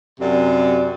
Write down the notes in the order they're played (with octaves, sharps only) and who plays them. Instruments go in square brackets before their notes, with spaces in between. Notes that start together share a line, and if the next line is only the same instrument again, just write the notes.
[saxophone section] F#2 C3 D5